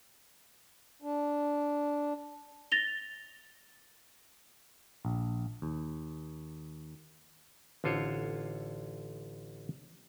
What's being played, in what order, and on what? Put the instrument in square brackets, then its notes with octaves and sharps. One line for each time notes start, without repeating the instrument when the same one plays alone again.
[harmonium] D4
[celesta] A6 A#6 F7 G7
[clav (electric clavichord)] A#1
D#2
A1 D3 F4 C5 C#5